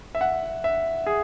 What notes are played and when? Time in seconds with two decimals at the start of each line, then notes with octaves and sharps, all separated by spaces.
0.15 E5
0.21 F#5
0.64 E5
1.06 G#4